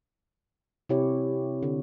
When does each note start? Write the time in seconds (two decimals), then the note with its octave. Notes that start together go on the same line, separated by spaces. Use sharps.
0.89 C3 C4 E4 G4 C#5
1.63 D3